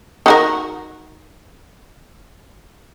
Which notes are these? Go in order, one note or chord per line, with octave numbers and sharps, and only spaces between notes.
D#3 F#4 A#4